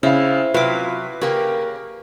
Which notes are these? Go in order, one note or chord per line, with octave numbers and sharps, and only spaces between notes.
C#3 C4 E4 F5
C3 F#3 E4 F4 B4 F5 D6
C#3 A#3 C#4 G4 A#4